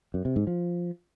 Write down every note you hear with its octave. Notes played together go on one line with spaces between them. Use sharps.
F#2
C3
G#2
F3